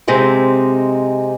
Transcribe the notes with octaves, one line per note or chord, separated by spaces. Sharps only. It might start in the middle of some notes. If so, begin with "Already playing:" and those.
C3 G#3 C4 D#4